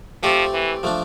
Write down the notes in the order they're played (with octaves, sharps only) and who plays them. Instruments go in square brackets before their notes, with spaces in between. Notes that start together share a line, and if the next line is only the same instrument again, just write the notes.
[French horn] F3 [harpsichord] A3 C4 G4 D5
[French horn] E3
[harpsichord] F3 A3 D4